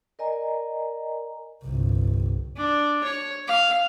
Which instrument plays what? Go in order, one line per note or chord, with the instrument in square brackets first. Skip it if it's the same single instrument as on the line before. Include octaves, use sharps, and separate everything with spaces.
[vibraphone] A#4 D5 D#5 G#5 A#5
[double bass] G1 C2
[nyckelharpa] D4
C#5
F5